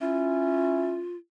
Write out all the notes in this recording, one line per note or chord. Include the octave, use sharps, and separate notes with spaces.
C#4 E4 F4